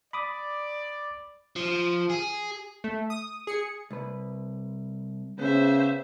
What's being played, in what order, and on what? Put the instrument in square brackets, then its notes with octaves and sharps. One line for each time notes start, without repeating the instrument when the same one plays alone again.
[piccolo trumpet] D5 [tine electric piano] B5 D6 D#6
[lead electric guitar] F3
G#4
[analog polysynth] A3
D#6
G#4 C#7
[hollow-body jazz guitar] C2 B4
[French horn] C#3 [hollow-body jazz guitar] B3 [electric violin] C5 E5